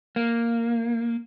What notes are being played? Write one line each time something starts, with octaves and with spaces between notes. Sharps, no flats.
A#3